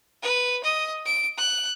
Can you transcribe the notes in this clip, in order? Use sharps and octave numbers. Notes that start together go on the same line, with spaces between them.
B4
D#5
D7
F#6